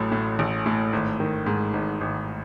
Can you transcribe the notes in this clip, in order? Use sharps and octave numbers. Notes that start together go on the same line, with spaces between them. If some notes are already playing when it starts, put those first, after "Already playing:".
Already playing: A1 A2 F#3
A2
A1
A2
G#1
D#3
G#2
G#1
G#1